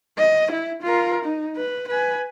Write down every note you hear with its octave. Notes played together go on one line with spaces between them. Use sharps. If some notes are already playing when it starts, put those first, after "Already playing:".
D#5
E4
F4 A#4
D#4
B4
B4 G#5